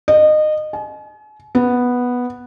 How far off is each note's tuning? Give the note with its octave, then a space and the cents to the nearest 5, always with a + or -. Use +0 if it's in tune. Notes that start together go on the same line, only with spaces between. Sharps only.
D#5 -25
G#5 +45
B3 -5